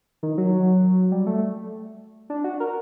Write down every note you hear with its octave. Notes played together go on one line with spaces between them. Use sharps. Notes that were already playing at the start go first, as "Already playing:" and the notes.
D#3
F#3
G3
A3
D4
F#4
A#4